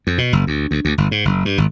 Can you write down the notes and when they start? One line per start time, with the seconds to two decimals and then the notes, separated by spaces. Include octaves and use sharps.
0.07 F2
0.18 B2
0.33 F#1
0.47 D2
0.71 D2
0.85 D2
0.98 G1
1.11 G#2
1.25 F#1
1.45 G2
1.58 G#1